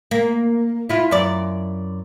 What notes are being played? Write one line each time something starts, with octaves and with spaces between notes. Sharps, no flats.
A#3
E4 F4
F#2 D5